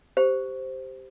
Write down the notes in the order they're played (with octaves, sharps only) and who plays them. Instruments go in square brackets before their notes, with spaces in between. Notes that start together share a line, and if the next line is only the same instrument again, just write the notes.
[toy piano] G4 C5